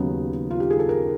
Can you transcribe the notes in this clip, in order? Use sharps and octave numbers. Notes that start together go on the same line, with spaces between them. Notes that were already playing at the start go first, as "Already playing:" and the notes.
Already playing: D#2 C#3 F#3 B3 D#4
F4
G4
G#4
A4
A#4